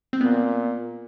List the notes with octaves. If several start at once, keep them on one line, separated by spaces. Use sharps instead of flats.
C4
A#2 B3